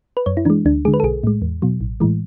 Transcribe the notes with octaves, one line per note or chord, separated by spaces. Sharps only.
B4
F#2 C#5
E4
E3 G#3 D4
D2 D4
D3 G#3 G#4
B4
A4
B1 G#4
A2 G#3
E2
B2 F#3
A1
A2 E3 G#3